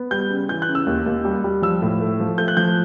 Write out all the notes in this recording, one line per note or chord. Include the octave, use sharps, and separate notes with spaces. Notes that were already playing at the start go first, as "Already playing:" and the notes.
Already playing: B3
G3 G6
C#3
E3 G6
F#6
C#3
E6
D#2
D#2
G3
G3
F3 E6
A2
A3
F3
A3 G6
F#6
F3 G6